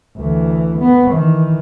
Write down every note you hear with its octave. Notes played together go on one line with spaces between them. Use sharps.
D2 E3
B3
D#3 E3